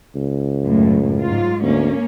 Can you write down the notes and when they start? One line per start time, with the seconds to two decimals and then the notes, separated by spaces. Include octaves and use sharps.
0.16 C#2
0.66 F#2 A2
1.22 G#2 F#3 F4
1.63 D2 A#3 C#4